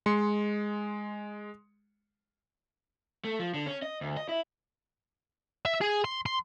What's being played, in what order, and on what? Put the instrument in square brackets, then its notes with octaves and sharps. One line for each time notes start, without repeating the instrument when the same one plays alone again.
[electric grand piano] G#3 C6 C#7
[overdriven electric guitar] A3
F3
D3
C#4
D#5
D2
D#5
E4
[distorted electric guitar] E5
G#4
C6
C6